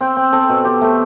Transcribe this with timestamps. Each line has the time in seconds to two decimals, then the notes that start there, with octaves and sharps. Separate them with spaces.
0.01 C4 G5
0.17 C4
0.32 C4 A4
0.49 B2
0.65 C4 G4
0.81 A3